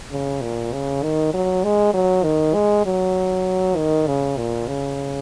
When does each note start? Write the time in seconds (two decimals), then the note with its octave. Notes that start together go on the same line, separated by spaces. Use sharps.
0.11 C#3
0.42 A#2
0.73 C#3
1.03 D#3
1.34 F#3
1.64 G#3
1.94 F#3
2.24 D#3
2.54 G#3
2.86 F#3
3.76 D#3
4.07 C#3
4.37 A#2
4.68 C#3